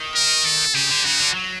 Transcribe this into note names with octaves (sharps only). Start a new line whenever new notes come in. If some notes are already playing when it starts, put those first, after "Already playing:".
Already playing: D#3
A#4
A4
C#3 G4
D3
C#3 F#4
D3
F#3